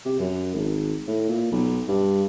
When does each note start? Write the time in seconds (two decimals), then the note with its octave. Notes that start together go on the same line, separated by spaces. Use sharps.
0.05 C3
0.19 F#2
0.55 G#1
1.08 A2
1.29 A#2
1.52 B1
1.88 G2